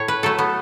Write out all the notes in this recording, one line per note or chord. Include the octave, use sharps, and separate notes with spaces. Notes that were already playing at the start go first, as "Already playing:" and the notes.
Already playing: A2 C#5
B4
F#3 A3 A4
B3